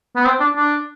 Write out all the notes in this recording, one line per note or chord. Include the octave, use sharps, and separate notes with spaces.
B3
C4
D4
D4